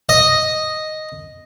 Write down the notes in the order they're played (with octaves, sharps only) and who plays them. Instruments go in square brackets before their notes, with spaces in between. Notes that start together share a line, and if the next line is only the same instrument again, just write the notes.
[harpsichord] D#5